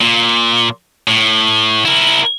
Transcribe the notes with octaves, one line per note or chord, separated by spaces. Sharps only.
A#2
A2
E4 A#4